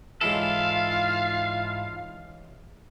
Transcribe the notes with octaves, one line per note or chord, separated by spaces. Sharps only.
G#2 E3 F#3 G#3 E4 F4 A4 F5